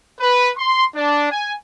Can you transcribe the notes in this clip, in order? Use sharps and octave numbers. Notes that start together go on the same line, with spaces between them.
B4
C6
D4
G#5